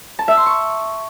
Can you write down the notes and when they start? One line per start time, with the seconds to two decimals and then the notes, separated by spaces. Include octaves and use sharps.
0.19 A5
0.28 E5
0.37 C6
0.46 C#6